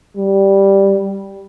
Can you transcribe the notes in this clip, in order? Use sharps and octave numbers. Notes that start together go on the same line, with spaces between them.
G3